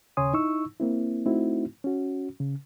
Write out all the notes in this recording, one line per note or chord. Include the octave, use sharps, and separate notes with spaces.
D#2 C#3 C#5 G#5 C6 D#6
D#4 E4 C#6 E6
A#3 C4 E4
A3 C4 D#4 E4 F#4
C#4 F#4
C#3